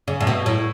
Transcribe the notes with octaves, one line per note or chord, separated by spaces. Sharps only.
C#3
A2
B2
A2